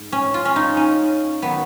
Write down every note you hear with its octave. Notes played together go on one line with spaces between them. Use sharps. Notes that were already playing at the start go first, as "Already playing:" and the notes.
Already playing: G#2
C#4
F4
C#4
D#4
C#4
D#3 F#3 B3